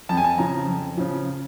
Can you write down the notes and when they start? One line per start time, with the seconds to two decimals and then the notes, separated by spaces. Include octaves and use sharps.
0.09 F2 A5
0.17 G#5
0.24 A5
0.38 C#3 F3 A#5
0.68 F2
0.97 C#3 F3